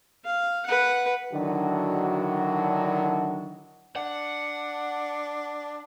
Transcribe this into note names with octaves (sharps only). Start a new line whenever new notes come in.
F5
B4 F#5
D3 D#3 F#3 D4 E4 F#4
D4 F#5